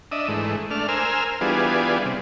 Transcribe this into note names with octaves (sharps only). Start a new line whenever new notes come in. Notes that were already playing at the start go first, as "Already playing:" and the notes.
D4 D#5 E5
G#2 E3 A3
A3 D4 F6
A#4 C5 G#5 E6 F6
E3 G3 B3 D4 F4 G#4
C3